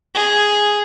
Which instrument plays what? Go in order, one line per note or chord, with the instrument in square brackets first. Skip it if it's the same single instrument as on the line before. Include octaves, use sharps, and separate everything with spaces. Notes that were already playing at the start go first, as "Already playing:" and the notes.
[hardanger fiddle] G#4